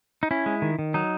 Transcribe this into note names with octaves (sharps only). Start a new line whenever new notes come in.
D#4
C#4 E4
G#3
D#3
D#3
F#3 D#4